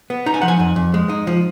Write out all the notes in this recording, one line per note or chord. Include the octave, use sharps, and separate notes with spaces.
B3
D#4 A#5
G#5
F3 F#5
G#5
F2
F2
G#3
D#4
F3